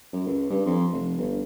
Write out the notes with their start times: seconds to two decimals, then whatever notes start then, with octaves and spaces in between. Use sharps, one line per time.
0.13 F#2
0.27 C#2
0.50 G2
0.66 F2
0.93 F1
1.18 G1